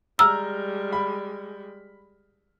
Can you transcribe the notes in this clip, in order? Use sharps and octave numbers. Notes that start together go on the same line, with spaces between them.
G3 G#3 A#5 E6 F6
B5